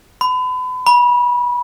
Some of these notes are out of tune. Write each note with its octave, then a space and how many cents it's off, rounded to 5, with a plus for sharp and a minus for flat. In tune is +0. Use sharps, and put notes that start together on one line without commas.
B5 +35
B5 -25